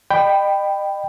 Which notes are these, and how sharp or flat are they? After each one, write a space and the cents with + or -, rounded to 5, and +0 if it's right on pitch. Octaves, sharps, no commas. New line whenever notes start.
D#5 -40 G5 +0 B5 +10